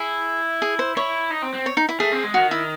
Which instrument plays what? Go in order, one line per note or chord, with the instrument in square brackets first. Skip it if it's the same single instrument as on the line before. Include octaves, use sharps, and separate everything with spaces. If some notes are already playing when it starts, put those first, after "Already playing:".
Already playing: [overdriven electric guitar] E4 [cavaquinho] G#4
[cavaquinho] G#4
C5
[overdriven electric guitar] E4 [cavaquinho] C#5
[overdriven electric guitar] D#4
C4
C4
[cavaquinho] C#5
D#4
E4
[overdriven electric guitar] A3 [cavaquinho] G#4
[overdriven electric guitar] C4
G#3
[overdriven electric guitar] D#3 [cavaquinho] F#4
[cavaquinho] E4